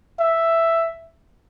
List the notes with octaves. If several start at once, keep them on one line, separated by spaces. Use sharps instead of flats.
E5